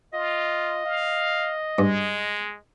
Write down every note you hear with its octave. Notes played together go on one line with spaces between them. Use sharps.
F4 D#5
F5
G2 G#3